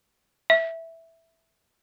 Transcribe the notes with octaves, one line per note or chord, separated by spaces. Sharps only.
E5